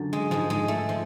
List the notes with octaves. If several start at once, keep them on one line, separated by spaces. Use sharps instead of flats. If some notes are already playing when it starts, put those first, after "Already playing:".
Already playing: F#2 D3 F3
G#3
G#2 F3 G#3
G#3
A3
F3